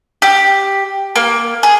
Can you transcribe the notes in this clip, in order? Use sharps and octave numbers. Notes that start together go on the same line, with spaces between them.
G4
A#3
G#4